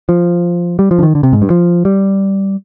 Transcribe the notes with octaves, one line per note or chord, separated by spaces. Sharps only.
F3
G3
F3
D3
D#3
D3
C3
G#2
G2
F3
G3